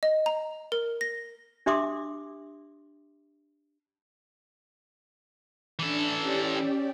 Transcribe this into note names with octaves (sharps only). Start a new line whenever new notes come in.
D#5
A#5
A#4
A#6
D4 G4 E5 C6 D6 D#6
E3 D4 A4
C#4 G4 D5